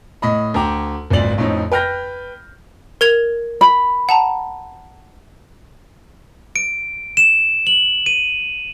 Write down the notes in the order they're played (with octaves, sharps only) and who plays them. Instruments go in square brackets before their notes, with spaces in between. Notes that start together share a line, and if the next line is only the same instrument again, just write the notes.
[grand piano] A2 D#5 B5
D2 G5 A#5 D6
G#1 C#2 A#2 D5 F#7
F2 A2 C4 C#4 D#4
B4 G5 F6 G6 A#6
[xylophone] A#4 G#6 F7
[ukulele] B5
[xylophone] F#5 A5 A#5
[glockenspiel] D7
E7
F#7
D#7